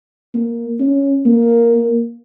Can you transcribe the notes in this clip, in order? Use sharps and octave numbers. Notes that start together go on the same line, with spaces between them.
A#3
C#4
A#3